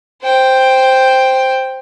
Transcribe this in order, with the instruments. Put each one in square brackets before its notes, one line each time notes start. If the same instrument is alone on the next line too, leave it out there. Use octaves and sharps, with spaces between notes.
[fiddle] C5 G5